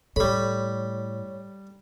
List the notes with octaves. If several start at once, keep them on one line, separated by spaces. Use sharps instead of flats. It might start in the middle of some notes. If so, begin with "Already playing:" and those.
A2 G3 A4 C#5 B5